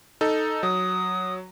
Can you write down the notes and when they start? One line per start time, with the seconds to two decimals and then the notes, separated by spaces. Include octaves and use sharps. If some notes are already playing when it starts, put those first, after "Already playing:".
0.21 D#4 A4
0.63 F#3 D#6